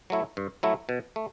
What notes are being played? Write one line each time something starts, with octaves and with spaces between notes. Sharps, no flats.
F#3 A3 E4
G2
F#3 A3 E4
B2
A3